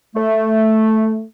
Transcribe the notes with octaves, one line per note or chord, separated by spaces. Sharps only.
A3